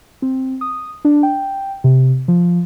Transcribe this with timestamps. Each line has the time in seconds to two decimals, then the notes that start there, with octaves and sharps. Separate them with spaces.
0.22 C4
0.61 D#6
1.05 D4
1.23 G5
1.84 C3
2.28 F3